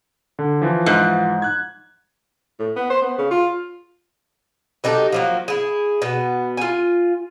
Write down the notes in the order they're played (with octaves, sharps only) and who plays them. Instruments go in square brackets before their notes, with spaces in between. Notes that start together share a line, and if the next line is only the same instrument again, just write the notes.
[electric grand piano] D3
E3 F3
[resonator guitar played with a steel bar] G#2
[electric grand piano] F#6 G#6
[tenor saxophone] A2
B3
C5
B3
C#3
F4
[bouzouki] F#3 D#4 G4 A4
F3 F#3 A#3
E4 G#4
B2 B3
F4 G#5